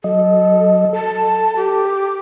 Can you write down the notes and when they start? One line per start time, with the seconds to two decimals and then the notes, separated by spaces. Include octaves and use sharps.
0.04 F#3 A4 D#5
0.93 A4 A5
1.56 G4